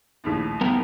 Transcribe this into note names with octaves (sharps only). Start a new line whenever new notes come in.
A#1 D#2 A2
G3 B3 A#4